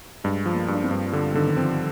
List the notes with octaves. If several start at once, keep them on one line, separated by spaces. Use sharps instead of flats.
G2 G#3
F3
A#3
G2
D4
C4
G2
D3 G3
D3 D#3
D#3
F3 C4